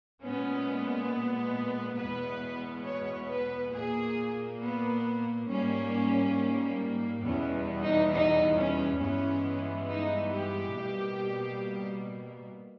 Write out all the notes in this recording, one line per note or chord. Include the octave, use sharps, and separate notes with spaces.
A#2 G#3 B3 C#4
E2 B2 G#3 B3 B4
C#5
B4
A#2 A#3 G#4
B3
G#2 G3 A#3 C#4
E2 B2 G3 B3 C#4
D#4
D#4
C#4
G2 E3 G#3 B3 C#4
D#4
G4
B2 G3 A#3